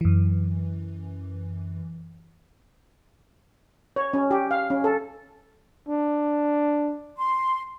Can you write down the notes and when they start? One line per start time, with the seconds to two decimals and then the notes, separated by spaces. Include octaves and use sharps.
0.01 F#2 E3
3.96 C#5
4.13 C#4
4.31 G4
4.51 F5
4.70 C#4
4.84 A4
5.88 D4
7.16 C6